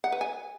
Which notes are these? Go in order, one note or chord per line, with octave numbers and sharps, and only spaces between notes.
F#5
B4
G#5